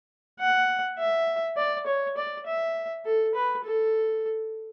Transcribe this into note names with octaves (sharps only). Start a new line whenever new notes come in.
F#5
E5
D5
C#5
D5
E5
A4
B4
A4